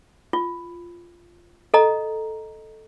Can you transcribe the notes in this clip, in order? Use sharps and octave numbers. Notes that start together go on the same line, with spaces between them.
F4
A4 D#5 A#5